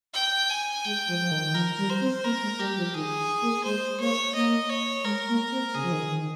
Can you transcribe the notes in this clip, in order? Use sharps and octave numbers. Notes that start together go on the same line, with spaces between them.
G5
G#5
G#3 G5
F3
F3
D#3
D#3
F3 A#4
G3
C5
C4
A#3 A#4
G#3
G3 G4
F3
D#3 G#4
A#3
G#3 C5
A#3 C#5
A#3 D#5
C#5
G#3 A#4
A#3
C4
C#3 G#4
F3
D#3
D#3
D#3